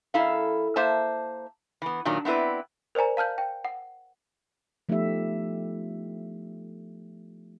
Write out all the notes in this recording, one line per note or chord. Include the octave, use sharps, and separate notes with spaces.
F#2 E4 A4 F5
A#3 C5 E5 A5
E3 B3
A#2 D#3 F#3 D4
B3 C4 E4 B4 D5
A#4 C5 D5 G#5 A#5
F5 A5 F6 G6
G5
F#5
F3 A3 B3 D#4 G4 E5